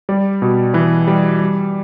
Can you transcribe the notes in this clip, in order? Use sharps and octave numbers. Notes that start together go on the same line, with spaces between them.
G3 D5
B2
E3 B4
G3
G3